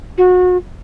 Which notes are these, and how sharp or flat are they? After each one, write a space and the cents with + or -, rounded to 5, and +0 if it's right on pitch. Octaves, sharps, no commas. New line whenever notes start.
F#4 -30